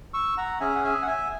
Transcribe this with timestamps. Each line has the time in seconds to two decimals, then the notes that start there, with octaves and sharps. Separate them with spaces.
0.14 C#6 E6
0.37 F#5 A#5
0.60 C#4 G#4 E5 G#5
0.75 F#5
0.84 E5 G#5
1.02 F#5
1.07 E5 G#5